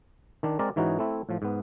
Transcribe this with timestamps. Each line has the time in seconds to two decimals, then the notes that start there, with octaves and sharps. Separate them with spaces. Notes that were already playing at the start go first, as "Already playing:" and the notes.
0.43 D#3 D4
0.59 G#3 C4 A#4 D5
0.76 G#2 E3 C#4 D#4 F#4 G#4
0.99 A3 C4 E4
1.29 A2 F3
1.42 G#2 B3